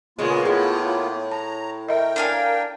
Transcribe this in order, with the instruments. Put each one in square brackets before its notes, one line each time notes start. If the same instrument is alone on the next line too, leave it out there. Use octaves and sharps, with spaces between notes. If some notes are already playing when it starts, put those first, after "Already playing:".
[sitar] A#2 C#3 G#3 [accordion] A#3 B3 F4
[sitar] A2 [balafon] G#4
[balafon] A5 [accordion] A#5
[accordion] A#4 G5 [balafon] D#5 E5
[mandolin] D4 F5 G#5